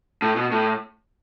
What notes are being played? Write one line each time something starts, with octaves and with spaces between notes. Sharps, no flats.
A2
B2
A2